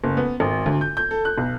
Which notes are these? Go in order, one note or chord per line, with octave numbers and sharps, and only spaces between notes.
F#1
B3
G#1
D2
G6
G6
A4
F#6
B1